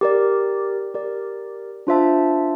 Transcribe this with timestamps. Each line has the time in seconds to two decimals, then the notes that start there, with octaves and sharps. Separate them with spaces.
0.01 G4 A#4 D5
0.94 G4 A#4 D5
1.87 D4 F4 C5 E5 A5